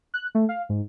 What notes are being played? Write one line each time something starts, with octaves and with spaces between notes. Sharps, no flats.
F#6
A3
F5
G#2